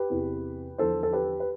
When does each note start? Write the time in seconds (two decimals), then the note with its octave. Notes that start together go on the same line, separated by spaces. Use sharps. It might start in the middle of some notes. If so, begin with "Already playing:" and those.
Already playing: G4 B4
0.10 E2 C3 E3
0.78 E2 D3 F3 A4 C5
1.03 A4
1.13 G4 B4
1.40 B4